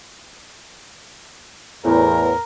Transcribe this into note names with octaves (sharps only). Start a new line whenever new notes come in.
E2 A2 A#4